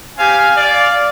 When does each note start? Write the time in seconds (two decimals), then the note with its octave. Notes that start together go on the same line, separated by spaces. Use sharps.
0.19 C4 G4 F5 G#5
0.56 D5 F5